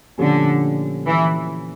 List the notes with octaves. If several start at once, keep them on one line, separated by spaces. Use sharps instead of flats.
A#2 D3 F3 A3 C#4 G4
E3